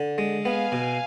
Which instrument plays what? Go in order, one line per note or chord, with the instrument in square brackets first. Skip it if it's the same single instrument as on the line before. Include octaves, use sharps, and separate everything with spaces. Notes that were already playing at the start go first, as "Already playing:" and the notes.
Already playing: [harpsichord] D3
G#3
[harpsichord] B3 [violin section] F5 G#5
[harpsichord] B2